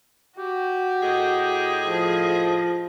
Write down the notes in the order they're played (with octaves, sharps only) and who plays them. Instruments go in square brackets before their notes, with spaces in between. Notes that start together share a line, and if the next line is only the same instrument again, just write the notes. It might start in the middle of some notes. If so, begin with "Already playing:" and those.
[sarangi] F#4 [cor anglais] G4
[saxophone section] A2 D#5 [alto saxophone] G#4
[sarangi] F3